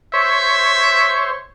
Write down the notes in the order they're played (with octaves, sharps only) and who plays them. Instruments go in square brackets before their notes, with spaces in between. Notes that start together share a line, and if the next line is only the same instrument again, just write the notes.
[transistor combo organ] C5 C#5 [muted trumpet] E5